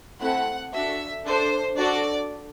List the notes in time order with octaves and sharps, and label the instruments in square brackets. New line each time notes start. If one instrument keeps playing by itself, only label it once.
[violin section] A3 C4 E4 A4 F#5
D4 F#4 A4 E5
D4 A4 C5
D4 F#4 A4 D5